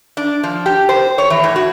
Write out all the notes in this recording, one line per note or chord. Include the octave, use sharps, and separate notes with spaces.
D4
F3
G4
C5
C#5
E3
A2
F#4